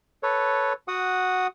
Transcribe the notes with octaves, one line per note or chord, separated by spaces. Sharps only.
A4 B4 C#5
F#4 F#5 D#6